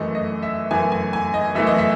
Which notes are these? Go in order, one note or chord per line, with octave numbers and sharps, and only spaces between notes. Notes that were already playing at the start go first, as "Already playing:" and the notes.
Already playing: F#2 E3 A3 D#5
D#5
E5
F#2 E3 A3 G#5
G#5
G#5
D#5
F#2 E3 A3 E5
D#5
E5